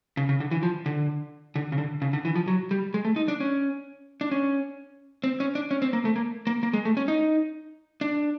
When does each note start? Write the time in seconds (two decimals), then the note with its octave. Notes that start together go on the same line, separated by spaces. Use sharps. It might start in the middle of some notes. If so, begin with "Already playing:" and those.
0.17 C#3
0.29 C#3
0.40 D3
0.51 E3
0.63 F3
0.86 D3
1.56 D3
1.72 C#3
1.78 D3
2.02 C#3
2.13 D3
2.25 E3
2.36 F3
2.48 F#3
2.71 G3
2.94 G#3
3.05 A3
3.16 D#4
3.28 D4
3.40 C#4
4.21 D4
4.31 C#4
5.24 C4
5.40 C#4
5.55 D4
5.71 C#4
5.82 C4
5.93 A#3
6.05 A3
6.16 A#3
6.47 A#3
6.63 A#3
6.73 G#3
6.85 A3
6.97 C#4
7.08 D#4
8.01 D4